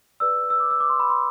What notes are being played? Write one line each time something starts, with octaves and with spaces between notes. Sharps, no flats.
G#4 B4 D5 E6
E6
D6
E6
D6
C6
B5
C6